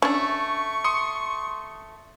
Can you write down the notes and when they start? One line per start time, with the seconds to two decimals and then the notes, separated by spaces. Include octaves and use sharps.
0.02 A3 C#4 D4 C#6
0.84 C6 D#6 C#7